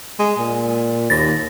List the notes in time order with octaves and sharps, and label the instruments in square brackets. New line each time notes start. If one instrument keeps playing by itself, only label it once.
[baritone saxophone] G#3
A#2
[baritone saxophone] D#2 [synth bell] A6 A#6